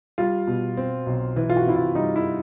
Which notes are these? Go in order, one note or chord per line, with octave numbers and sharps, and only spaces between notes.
G3 F4
B2
C4
B1
E3
F4
F#4
C3 E4
F4
G3 D#4
E4